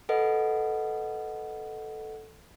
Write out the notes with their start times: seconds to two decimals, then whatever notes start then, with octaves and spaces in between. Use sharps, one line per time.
0.09 A4 B4 D#5 F#5